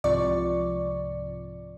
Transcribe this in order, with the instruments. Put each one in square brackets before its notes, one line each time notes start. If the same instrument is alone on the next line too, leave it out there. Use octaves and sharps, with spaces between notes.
[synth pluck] C2 G#2 C3 F3 D5 C#6